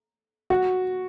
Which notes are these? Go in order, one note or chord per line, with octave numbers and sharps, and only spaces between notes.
F#4